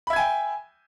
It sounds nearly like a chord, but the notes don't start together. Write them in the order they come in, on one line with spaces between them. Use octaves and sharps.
B5 E5 G#6 G#5 G5